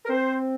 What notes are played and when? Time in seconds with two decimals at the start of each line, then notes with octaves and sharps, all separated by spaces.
0.05 A#4
0.09 C4 C5